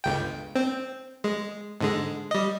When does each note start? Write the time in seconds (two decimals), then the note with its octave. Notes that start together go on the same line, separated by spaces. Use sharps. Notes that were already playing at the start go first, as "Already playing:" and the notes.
0.04 G1 C#2 G5
0.56 C4
1.24 G#3
1.81 G#2 D3 G#3
2.31 G3 D#5